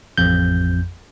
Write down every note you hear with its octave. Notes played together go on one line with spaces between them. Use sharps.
A1 F2 G6